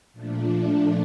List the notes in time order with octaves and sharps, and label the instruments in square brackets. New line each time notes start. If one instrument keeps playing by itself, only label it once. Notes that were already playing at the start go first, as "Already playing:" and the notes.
[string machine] A#2 F3 A3 D4